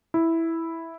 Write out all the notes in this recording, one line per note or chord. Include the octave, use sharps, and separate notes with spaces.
E4